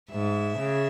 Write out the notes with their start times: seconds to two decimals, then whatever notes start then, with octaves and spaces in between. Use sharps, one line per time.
0.11 G#2 E5
0.58 C#3